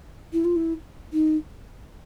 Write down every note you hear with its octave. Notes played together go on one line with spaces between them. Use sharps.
E4
F4
E4
D#4